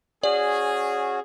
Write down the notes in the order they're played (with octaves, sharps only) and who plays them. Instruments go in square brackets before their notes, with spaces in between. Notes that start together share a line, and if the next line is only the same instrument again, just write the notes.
[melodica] C#4 F#4 [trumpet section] G#4 [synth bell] D5